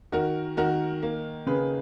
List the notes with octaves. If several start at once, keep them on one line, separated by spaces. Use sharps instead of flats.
D#3 F#4 A#4
D#3 F#4 A#4
A#3
C#3 G#4 B4